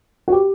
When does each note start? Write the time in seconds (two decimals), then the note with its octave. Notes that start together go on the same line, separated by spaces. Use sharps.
0.28 F#4
0.32 G4